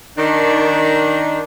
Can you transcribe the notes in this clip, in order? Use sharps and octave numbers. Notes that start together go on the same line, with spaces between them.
D#3 D4